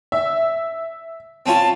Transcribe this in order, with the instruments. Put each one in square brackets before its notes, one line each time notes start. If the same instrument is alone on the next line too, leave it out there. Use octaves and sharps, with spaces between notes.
[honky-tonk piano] E5
[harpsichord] C4 C#4 F4 [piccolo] A5